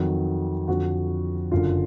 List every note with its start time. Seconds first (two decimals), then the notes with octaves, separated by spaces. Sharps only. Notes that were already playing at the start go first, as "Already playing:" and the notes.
Already playing: F2 D#3 F#3
0.68 F2 D3 F3 F#4
1.51 F#1 F#2 D3 F4